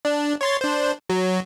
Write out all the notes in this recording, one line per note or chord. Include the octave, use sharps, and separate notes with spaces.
D4
C#5 C6 A6
D4 C5
F#3